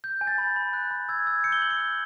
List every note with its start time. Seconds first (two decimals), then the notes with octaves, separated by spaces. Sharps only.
0.04 G6
0.21 G#5
0.27 A6
0.38 B5
0.56 B5
0.73 F#6
0.91 B5
1.09 E6 G#6
1.26 E6 G#6
1.44 G6 C#7
1.52 G7
1.62 G6 F#7
1.71 G7
1.79 F#6